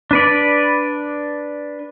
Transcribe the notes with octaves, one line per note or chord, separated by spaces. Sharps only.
D4 B4 D5